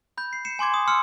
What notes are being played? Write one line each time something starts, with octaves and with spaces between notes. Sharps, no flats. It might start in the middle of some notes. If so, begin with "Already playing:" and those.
B5 G6
C7
C7 C#7 E7
G#5 C6 D6 G#6
D#6
C6 E6 F6 C#7